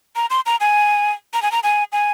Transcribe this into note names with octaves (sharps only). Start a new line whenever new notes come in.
A#5
C6
A#5
G#5
A#5
G#5
A#5
G#5
G#5